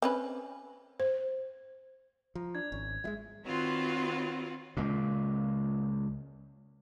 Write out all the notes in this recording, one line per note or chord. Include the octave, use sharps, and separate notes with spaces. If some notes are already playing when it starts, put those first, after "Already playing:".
C4 C#4 B4
C5
F3 A#5
D4 G#6
G#1 C#4
F3 G#3 E5
D#3 C4 F4 F#4 B4 C#5
C#2 A#2